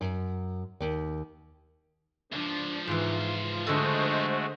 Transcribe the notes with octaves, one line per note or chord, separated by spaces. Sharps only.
F#2
D#2
C#2 F3 D4
G#2 E3 F4
D3 G#3 A3 F#4 A4 C5 D#5